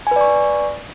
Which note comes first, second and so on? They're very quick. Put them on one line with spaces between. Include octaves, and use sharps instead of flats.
G#5 B4 D5 C#6